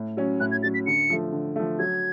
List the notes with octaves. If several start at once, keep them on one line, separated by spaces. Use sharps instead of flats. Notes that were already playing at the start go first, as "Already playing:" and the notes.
Already playing: A2
F#3 C#4
A2 F#6
G#6
F#3 C#4 A6
B6
D3 C#7
F3 A3
D3
F3 A3
F#3 G#6